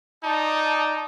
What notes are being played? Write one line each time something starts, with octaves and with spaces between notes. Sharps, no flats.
D#4 F4 D5 A5